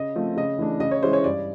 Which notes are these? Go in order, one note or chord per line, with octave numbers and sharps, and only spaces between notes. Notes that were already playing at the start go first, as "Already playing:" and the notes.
Already playing: C#3 D#5
F3 A3 C4
C#3 D#5
E3 A3 D4
C#3 D#5
C#5
E3 G#3 C#4 E4 C5
C#5
G2 D5